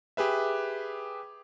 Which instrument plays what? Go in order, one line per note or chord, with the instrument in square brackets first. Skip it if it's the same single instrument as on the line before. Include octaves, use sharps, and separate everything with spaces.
[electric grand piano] G4 G#4 B4 E5